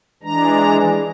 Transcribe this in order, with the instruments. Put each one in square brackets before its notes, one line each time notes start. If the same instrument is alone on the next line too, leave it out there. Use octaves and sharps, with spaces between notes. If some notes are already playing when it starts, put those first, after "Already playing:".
[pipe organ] E3 G#3 D4 A#5